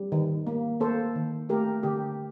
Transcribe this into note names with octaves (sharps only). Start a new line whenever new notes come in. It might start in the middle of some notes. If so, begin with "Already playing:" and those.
Already playing: G3
D#3
A#3
A#3 A4 C5
D#3
A3 G4 A#4
D3 G4